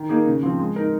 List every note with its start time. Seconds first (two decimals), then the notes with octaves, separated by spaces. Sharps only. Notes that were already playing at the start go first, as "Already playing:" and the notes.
Already playing: D#3
0.09 A#3 D#4 G#4
0.26 C#3
0.43 F3 C4
0.59 G#3
0.76 D#4 A#4